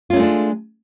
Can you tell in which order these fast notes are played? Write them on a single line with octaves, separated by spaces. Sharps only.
F4 C#4 A3 G#3 D4